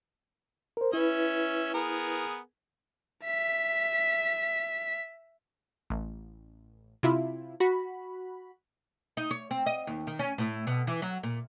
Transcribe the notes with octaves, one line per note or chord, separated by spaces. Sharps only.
A#4 C5
C#4 E4 B4 E5
B3 G#4 A#4
E5 B6
A1
C3 E4 F4
F#4 B5
D#4
C#5
C4
D#5
D#2
D#3
C#4
A2
B2
E3
F#3
A#2